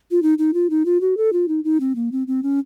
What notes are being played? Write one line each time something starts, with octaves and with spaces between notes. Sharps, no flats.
F4
D#4
D#4
F4
D#4
F4
F#4
A4
F4
D#4
D#4
C4
A#3
C4
C4
C#4